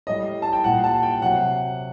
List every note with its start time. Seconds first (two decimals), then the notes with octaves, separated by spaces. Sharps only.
0.07 A2 G3 D#5
0.42 A5
0.53 G5
0.64 A#2 G3 F#5
0.84 A5
1.03 G5
1.22 C3 F#3 F#5